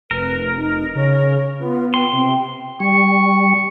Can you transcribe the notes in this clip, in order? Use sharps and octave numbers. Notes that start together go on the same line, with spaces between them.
F1 A#4 B4
D#4
C#3 C#5
B3 F4
G5 C6
C3
G3 C#6